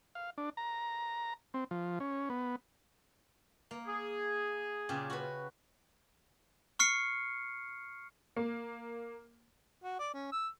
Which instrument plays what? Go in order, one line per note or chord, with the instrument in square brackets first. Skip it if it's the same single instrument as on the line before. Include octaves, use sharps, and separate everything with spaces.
[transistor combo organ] F5
D4
A#5
C4
F3
C#4
B3
[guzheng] A#3
[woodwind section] G#4
[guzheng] A#2 C#3 G4
F#4 B4
[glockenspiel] C#6 F6 C7 C#7
[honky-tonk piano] A#3
[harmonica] F#4
D5
C#4
E6